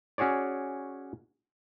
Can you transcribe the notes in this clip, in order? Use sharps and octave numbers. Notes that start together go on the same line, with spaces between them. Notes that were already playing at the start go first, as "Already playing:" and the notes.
C#4 F#4 G#4 C#5 D5